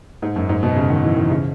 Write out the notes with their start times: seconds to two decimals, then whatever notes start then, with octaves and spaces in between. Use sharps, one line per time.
0.22 G#2
0.36 F#2
0.49 G#2
0.63 B2
0.76 C#3
0.90 D#3
1.03 E3
1.16 D#3
1.30 C#3